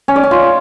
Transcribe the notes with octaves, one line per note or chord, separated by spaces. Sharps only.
C#4
D5
C#4
F4